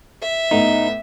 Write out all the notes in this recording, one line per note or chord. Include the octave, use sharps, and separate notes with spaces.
E5
A2 A3 B3 D#4